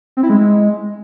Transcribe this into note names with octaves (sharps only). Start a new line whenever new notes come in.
C4
E4
G#3